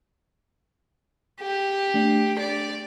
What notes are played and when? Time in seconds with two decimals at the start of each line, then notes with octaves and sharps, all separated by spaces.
1.41 G4
1.94 A3 D4 C7
2.39 D5